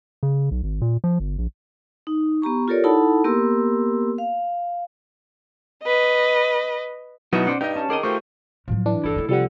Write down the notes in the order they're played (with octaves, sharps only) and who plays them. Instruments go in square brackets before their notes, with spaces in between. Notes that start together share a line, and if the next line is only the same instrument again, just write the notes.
[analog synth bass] C#3
B1
G#1
A#2
F3
G1
A#1
[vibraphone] D#4
B3 G4 A#5 C#6
F4 G4 A4 A#4 C#5 D5
D#4 E4 A4 F#5 A5 B5
A#3 B3 G4 A#4 C6 E6
F5
[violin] B4 D#5
[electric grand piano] B2 D#4 D#7 [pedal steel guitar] F#3 [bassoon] B3 [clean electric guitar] E4 E5
[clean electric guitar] C#4 [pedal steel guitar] C5 D5 F#5
[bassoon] G2 [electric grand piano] D#4 D#5 [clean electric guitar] G4 [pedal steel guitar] G5
[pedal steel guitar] C#4 A5
[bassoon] D#3 [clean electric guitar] G#4 A#4 D#5 [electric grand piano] D6 D#7
[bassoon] D#3 [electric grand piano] A3 G4 C5 [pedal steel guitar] F4 C#6
[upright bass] A2 F#3 [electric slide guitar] F3
[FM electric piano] E3 D4
[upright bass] G1 [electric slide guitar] E4 A4
[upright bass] A3 A#3
[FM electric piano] C2 F3 G3 [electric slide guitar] A4 F#5